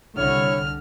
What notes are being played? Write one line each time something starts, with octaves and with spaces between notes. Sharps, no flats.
C2 D3 E4 C#5 F6